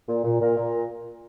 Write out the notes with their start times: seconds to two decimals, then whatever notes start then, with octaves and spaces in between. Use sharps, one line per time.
0.09 A#2
0.24 A#2
0.40 A#2 A#4
0.57 A#2